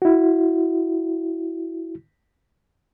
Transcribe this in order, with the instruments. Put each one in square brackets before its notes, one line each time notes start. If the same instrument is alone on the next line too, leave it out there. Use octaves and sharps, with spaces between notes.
[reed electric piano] E4 F#4